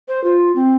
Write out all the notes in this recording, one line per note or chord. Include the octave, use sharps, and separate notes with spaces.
C5
F4
C4